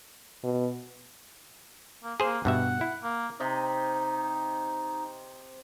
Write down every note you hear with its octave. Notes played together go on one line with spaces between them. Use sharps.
B2
A#3
A#3 G#4 C5
G2 B2 E5 F#5
E4
A#3
C3 D#4 D#5